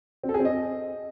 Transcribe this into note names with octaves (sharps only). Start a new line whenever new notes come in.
C4
A4
G#4
C4
D#5